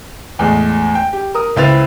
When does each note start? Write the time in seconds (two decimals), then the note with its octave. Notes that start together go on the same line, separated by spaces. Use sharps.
0.39 E2 A2 G#3
0.95 G5
1.13 G4
1.34 A#4 D#6
1.56 C#2 C4 E4 B4 A6 F7